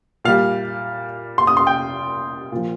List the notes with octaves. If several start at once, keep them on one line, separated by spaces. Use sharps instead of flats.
A#2 G3 F5
C6
D#6
C6
G5
A#2 F3